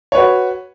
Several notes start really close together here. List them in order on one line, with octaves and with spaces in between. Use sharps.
C#5 B4 F#4